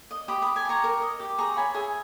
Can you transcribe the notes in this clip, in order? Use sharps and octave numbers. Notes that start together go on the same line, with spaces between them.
D#5
G4 B5 D#6
G4 B5 D#6
G#5 B5
G4 A#5 C#6
A#4
D#5
G4
G#4 A#5 C#6
C#5 G#5 B5
G#4 E5 G#5